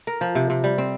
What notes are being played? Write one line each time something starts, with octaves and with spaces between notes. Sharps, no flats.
A#4
F3
C3
C3
G3
C4